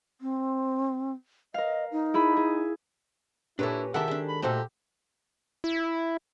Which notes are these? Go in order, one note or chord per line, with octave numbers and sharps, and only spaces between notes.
C4
A#4 D#5 F5
D#4
E4 G#4 B5
G#4
A#2 C#4 D4 E4 G4 A4 B4 C#5
C3 D#3 G#3 D4 G4 A4 E5 F#5
G#3 D4 G4
B5
A#2 A3 D#4 F#4 G4 A4 C5
E4